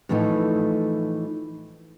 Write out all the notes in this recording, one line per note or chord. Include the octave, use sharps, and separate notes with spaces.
A2 E3 F3 A3 D#4